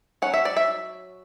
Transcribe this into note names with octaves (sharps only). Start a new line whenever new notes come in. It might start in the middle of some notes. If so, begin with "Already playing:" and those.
F#3 C#4 F#5
E5
D5
E5